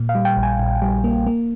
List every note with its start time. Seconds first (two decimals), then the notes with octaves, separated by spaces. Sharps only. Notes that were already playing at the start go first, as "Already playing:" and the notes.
Already playing: A#2
0.09 F5
0.15 G3
0.25 G5
0.37 A#1
0.43 G#5
0.59 A#1
0.82 G3
1.04 A#3
1.27 A#3